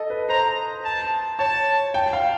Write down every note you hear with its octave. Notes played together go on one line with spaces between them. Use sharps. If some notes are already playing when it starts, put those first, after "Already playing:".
Already playing: A4 D#5
B4
C5 A#5
A5
C#5 A5
G5
F5